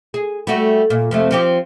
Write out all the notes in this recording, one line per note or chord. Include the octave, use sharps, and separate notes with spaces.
G#4
G3 A3 F#4
A#2
F2 C3 A3
F3 C4 G4